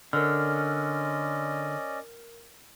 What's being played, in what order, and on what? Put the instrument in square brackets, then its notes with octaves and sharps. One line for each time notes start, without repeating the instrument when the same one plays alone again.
[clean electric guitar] D3 [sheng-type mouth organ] C#4 D5 D#5 [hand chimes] A#4 F6